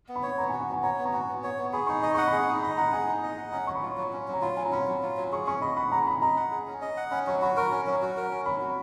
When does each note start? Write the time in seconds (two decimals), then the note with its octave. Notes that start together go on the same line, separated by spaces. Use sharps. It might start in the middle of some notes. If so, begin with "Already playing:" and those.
0.08 B3
0.16 B5
0.23 C#5
0.38 B3 A#5
0.49 G#5
0.53 F#4
0.61 F#5
0.69 B3 G#5
0.83 C#5 A#5
0.98 B3
1.05 A#5
1.13 F#4 G#5
1.21 A#5
1.29 B3
1.43 C#5
1.58 B3
1.73 G#4 B5
1.87 D#4 C#6
2.00 D#5 B5
2.14 F#5 C#6
2.27 G#4 B5
2.47 D#4
2.62 D#5 B5
2.78 F#5 A#5
2.92 G#4 G#5
3.08 D#4
3.23 D#5
3.37 F#5
3.52 C#4 A#5
3.67 F#3 C#6
3.75 B5
3.83 F4
3.98 F#3
4.13 C#4
4.28 F#3
4.33 A#5
4.42 F4 B5
4.57 F#3 G#5
4.65 A#5
4.72 C#4 B5
4.87 F#3
5.03 F4
5.17 F#3
5.32 G#4 C#6
5.46 C#4 C#6
5.61 D#5 B5
5.76 F#5 B5
5.92 G#4 A#5
6.07 C#4 B5
6.21 D#5 A#5
6.37 F#5
6.51 G#4
6.67 C#4
6.82 D#5
6.97 F#5
7.11 C#4 B5
7.27 F#3 C#6
7.42 F#4 B5
7.57 A#4 C#6
7.71 C#4
7.87 F#3
8.02 F#4
8.17 A#4
8.31 C#4
8.46 F#3 B5
8.61 F#4